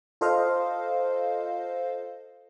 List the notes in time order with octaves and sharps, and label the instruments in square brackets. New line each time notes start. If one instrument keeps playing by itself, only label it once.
[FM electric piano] F4 A4 C5 D#5 F5